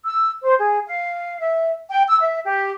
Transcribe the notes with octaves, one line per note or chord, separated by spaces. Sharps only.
E6
C5
G#4
F5
E5
G5
E6
E5
G4